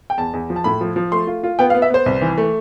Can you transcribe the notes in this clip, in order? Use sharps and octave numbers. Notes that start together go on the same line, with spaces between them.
G5
E2 A5
E2
F3
A5
A2 B5
F3
F3
A3 C6
F4
F4
B3 G5
F5
B3
E5
B3 C5
C2
E3
A3